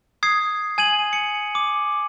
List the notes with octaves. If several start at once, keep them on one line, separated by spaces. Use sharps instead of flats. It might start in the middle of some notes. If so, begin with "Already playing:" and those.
D#6 G#6 C7
G#5 G#6 D#7 F#7
C#7
D6